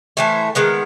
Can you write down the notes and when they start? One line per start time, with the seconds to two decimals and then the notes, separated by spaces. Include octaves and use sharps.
0.17 A2 E3 A3 C5
0.55 D#3 G#3 B3